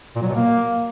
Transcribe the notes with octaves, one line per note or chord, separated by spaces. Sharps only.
A#2
F#3
B2
A#3